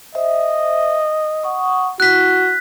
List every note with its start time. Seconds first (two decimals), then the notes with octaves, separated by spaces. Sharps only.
0.15 C5 D#5 E5
1.44 F#5 C#6 D#6
2.00 E4 F#4 F#6 B6